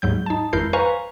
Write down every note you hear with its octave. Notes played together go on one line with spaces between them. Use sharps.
D#2 G#2 F#3 G6
D#4 A5
G#1 F2 E4 A#4 G6 C7
B4 C5 F5 G#5 A#5 C#6